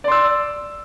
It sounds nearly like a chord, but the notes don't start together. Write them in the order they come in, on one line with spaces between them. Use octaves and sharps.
D5 C6 E6